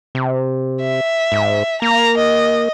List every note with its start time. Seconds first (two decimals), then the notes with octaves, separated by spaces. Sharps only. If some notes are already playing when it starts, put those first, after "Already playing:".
0.15 C3
0.82 E5
1.32 G#2
1.82 A#3 A#5
2.17 D#5